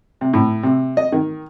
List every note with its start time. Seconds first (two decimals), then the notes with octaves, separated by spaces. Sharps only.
0.21 C3
0.33 A2
0.63 C3
0.97 D#5
1.12 D#3